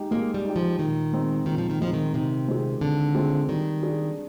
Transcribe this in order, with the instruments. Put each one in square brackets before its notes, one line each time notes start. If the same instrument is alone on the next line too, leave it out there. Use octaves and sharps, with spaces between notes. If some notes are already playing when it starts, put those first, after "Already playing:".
Already playing: [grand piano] G#3 D#4 G4
[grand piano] G#3 [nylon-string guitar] A#3
[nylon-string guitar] G3
[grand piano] D#4 G4
[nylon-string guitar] F3
[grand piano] A#2 [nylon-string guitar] D#3
[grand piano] G#3 C4 D#4
[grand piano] A#2 [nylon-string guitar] D#3
[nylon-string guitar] F3
D#3
[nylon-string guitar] F3 [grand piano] G#3 C4 D#4
[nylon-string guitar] D#3
[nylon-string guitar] C3 [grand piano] D#3
[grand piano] G#3 C4 F4 G#4
[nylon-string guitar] D3 [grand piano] D#3
[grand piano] G#3 C4 F4 G#4
[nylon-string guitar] D#3 [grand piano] G3
[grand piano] D4 G#4